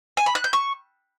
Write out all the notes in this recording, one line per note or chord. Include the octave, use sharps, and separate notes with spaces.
G#5
B5
F#6
G6
C#6